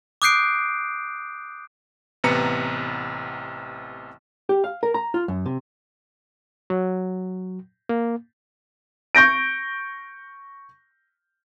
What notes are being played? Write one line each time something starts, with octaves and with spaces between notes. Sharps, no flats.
D6 D#6 F#6 G6 C7 D7
A1 C3 B3 B4 A#5 C#7
G4
F5
A#4
A#5
F4
F#2
C3
F#3
A#3
C#6 G6 A#6 D7